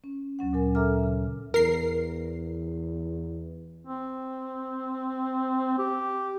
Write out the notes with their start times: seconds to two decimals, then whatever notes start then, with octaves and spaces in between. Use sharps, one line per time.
0.04 C#4
0.39 D2 F#3 C#4 F#5
0.53 A#2 F#3 A#4 G#5
0.75 A4 A#4 E5 A#5 D6 F6
1.04 C#3
1.54 E2 A#4 C7
3.85 C4
5.78 G4